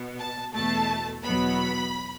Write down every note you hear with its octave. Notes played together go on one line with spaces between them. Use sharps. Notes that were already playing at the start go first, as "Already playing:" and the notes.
Already playing: B2 B3
A5
E2 B2 A3 A5
E2 B2 F#3 B3 B5